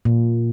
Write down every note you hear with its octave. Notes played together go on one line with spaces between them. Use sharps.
A#2